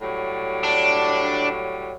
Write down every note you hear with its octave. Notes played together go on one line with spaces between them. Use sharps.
A2 F#3 G3
D4